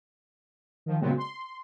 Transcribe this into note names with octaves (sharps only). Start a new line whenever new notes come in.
D#3 F3
A#2 C#3 F#3 G#3 B3 C4
C6